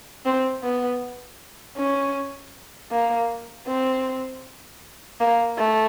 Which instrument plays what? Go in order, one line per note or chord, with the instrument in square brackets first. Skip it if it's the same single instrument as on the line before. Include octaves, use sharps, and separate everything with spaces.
[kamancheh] C4
B3
C#4
A#3
C4
A#3
A3